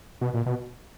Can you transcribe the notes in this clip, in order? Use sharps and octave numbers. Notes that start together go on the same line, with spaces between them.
B2
A#2
B2